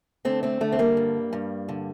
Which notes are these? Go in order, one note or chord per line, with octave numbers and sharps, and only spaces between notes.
D3 A3 C4
A3 C4
D3 A3
C4
G3 A#3
G2
G2
D3